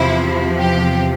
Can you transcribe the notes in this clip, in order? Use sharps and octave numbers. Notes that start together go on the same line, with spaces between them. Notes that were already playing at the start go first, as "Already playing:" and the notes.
Already playing: E2 C3 F3 E4
G4